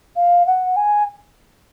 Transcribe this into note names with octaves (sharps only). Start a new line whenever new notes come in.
F5
F#5
G#5